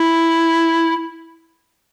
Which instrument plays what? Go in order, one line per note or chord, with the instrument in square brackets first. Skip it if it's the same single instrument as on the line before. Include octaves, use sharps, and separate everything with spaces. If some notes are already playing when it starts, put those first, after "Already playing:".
Already playing: [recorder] E4